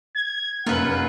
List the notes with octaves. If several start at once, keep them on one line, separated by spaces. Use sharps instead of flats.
G#6
F1 F#2 A#3 F4 B4 F#5